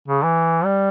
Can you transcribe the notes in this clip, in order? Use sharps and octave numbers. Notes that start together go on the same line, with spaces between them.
C#3
E3
G3